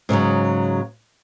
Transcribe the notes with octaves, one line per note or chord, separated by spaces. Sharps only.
G#2 C#3 E3 F#3